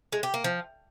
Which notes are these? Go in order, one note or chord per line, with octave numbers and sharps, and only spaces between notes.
G#3
G4
A#3
F3